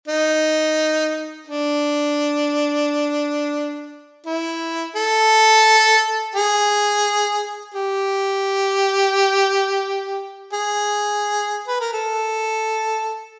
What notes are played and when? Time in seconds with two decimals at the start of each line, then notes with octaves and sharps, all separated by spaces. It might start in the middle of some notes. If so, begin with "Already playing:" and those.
0.08 D#4
1.47 D4
4.26 E4
4.96 A4
6.36 G#4
7.74 G4
10.53 G#4
11.67 B4
11.80 A#4
11.93 A4